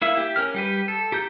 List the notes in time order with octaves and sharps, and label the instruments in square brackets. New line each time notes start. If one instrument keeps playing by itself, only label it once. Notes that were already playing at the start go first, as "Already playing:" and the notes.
[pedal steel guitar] A#3 E4 E5
G4
C#4 A#4 F6
G3 G4 B4
A4
G4 A#5 G6